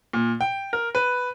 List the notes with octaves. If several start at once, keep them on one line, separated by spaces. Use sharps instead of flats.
A#2
G5
A#4
B4